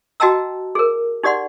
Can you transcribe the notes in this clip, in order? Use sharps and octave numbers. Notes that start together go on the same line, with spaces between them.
F#4 D#5 G5 A5 A#5 E6
G#4 A#4
D#4 G4 D5 F#5 C6